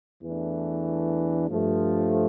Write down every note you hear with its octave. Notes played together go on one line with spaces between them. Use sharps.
E2 E3 A3 D4
G2 F3 A3